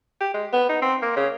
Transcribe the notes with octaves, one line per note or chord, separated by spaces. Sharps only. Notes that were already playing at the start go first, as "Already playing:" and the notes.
G4
G#3
B3
D#4
C4
A#3
C#3